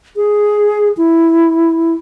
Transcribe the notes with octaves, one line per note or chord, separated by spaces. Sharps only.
G#4
E4